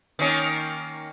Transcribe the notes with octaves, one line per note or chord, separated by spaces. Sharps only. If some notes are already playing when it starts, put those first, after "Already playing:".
D#3 A#3 C#4